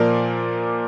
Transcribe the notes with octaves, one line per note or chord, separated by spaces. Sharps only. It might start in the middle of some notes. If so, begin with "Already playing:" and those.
Already playing: A#2 F3 A#3 A#4 D5